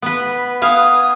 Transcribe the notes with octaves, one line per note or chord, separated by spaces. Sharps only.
B3 B4
B3 F5 G#5 D#6